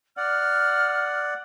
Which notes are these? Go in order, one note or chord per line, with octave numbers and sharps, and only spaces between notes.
D5 F#5 F6